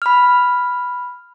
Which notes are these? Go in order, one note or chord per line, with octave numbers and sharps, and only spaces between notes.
B5 F6